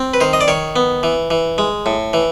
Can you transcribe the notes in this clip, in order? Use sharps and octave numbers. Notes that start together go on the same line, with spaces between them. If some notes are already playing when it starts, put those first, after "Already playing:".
Already playing: C4
B4
D#3 C5
D#5
D5
D#3 C#5
B3
E3
E3
G#3
A2
E3